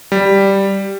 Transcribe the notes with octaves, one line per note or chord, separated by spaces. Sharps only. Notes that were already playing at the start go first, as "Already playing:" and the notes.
G3